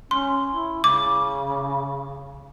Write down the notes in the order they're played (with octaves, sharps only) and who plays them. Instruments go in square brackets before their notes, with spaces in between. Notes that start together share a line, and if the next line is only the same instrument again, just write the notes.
[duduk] C#4 [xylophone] C6
[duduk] E4
[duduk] C#3 [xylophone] D6